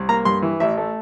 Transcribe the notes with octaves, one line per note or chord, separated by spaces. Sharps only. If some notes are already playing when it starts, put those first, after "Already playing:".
Already playing: C2
A#3 A#5
G2 C6
E3
A1 E5
A3